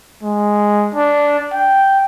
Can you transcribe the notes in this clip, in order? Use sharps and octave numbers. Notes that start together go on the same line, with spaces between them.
G#3
D4
G5